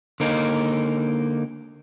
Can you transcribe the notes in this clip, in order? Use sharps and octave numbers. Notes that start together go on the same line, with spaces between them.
D3 A#3 D#4